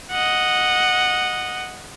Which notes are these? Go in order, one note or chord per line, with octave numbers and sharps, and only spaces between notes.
D#5 F#5